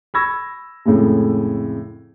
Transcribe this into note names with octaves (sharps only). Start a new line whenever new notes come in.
B5 C#6 E6 G#6 A#6
F2 A2 C#3 G#3 A3